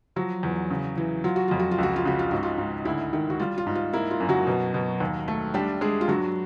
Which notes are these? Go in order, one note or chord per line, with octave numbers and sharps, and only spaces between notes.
F3 F#3 F#4
E2
C#3
E3
F#3 F4
F#4
F2 F4
F#4
F4
C#2 F#4
F4
C#3 F#4
F4
G#2 F#4
F4
G#2
D2 E4
D#3
F#4
G3 F4
F4
G#2
F4
A#3 E4
F4
F#2
F#3 F#4
B2
B2
D#2
A3
G3 D4 G4
G#3 D4 G#4
F4
G2 F#3 F#4